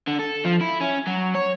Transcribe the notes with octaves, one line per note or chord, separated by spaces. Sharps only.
D3
A4
F3
E4
C#4
F#3
C#5